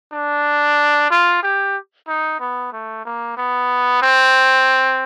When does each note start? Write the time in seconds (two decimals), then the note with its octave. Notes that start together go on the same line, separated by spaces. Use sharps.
0.13 D4
1.11 F4
1.43 G4
2.08 D#4
2.40 B3
2.73 A3
3.05 A#3
3.37 B3
4.02 C4